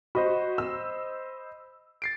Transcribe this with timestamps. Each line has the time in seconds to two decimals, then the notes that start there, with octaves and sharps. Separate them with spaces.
0.15 F#4 C5 D#5 B5
0.58 E6
2.02 A6 C7 D7